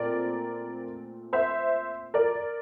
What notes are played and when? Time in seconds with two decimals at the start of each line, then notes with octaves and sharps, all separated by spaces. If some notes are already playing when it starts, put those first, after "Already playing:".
Already playing: A#2 A3 C4 A#4 D5
1.33 C5 E5
2.14 A#4 D5